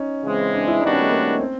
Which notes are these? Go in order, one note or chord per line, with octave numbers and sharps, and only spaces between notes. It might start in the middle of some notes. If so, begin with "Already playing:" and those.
Already playing: C#4 D#4
C#3 E3 G#3 C4
D4
E4
D#3 G3 B3 D4 D#4 F#4
C#4
A3
A#3
C4